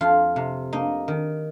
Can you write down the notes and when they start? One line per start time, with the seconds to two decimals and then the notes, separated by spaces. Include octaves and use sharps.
0.01 F2 F4
0.36 C3
0.73 A#3 D#4
1.08 D#3